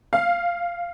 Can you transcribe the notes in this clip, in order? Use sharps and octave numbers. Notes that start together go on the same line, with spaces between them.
F5